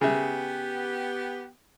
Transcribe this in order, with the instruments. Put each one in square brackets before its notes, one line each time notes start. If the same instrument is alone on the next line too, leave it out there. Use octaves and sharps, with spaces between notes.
[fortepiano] C#3 E5 [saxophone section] B3 G4